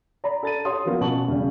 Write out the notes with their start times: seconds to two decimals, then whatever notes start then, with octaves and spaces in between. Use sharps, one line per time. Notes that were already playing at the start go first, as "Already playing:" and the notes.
0.24 D5 A#5 B5
0.43 A4 A6 D#7
0.65 G4 C#5 C6 D#6
0.85 F3 F#3 A#3 B3
1.01 B2 B3 C#4 A5 C#6 F#7
1.28 E1 C#3 G3